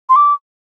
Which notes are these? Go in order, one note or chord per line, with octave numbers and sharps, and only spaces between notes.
C6
D6